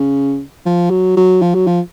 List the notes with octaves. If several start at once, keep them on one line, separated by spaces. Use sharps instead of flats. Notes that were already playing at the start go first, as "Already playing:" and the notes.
Already playing: C#3
F3
F#3
F#3
F3
F#3
F3